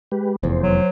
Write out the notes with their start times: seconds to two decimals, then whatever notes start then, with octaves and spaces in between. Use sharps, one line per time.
0.12 G#3 G4 B4
0.43 F1 E2 C5
0.63 F#3